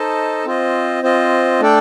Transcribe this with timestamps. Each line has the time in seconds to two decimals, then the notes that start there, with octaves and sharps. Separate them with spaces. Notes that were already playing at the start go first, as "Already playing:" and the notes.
Already playing: D#4 A4 C5 D#5 A5
0.45 C4 F4 C5 D#5
1.03 C4 F4 C5 D#5
1.60 A3 D4 A4 D5 G5